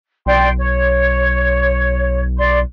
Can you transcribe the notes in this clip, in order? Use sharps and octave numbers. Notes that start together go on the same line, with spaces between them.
B1 D5 G5 C6
C#5
D5 C6